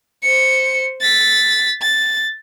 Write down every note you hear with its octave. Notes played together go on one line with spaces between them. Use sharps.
C5 C#7
A6 B6
A6